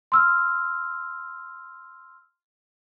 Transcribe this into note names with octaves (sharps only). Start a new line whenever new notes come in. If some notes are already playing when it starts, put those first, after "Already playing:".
C6 E6 F6